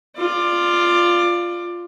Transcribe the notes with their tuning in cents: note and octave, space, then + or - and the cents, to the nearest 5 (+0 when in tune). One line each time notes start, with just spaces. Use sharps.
F4 +0 D5 +20